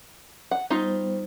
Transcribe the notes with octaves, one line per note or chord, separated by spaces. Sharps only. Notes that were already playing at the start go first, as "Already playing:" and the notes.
F#5
G3 B3 D#4 F4 C5